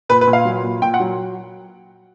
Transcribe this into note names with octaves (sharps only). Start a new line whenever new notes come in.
A#2 B4
B4
A#2
F5
F#3
A#2
A#2 G5
F#5
F#3